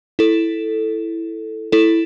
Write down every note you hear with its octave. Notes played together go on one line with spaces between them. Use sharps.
E4 A4
E4 A4